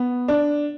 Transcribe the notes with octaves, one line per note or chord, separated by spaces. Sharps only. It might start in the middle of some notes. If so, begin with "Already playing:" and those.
Already playing: B3
D4